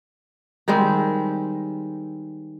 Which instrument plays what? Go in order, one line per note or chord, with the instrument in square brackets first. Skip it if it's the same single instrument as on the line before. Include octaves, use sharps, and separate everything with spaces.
[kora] D#3 G3 G#3 C4